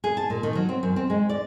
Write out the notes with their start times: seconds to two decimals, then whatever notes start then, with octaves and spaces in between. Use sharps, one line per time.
0.04 G#4
0.17 A5
0.30 A#2
0.43 D#3
0.55 F#3
0.69 C4
0.83 F#2
0.96 C4
1.10 G#3
1.29 D5